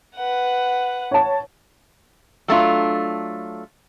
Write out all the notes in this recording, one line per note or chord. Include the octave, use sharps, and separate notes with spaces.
B4 F#5
C#5 A5
F#3 A3 D4 F4